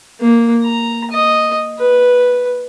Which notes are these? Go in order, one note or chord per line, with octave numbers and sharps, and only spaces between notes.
A#3
A#5
D#5
B4